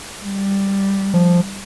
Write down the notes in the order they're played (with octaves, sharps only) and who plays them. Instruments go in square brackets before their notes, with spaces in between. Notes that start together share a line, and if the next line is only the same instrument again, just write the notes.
[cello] G3
[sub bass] F3